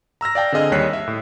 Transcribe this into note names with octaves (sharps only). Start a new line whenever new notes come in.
A#5 E6 F6 A#6
D5 F5 G5 A5
D3 C4 G#4 D#5 F6 A#6
D#2 G3 C#5 F#6 B6 C7
E5
A2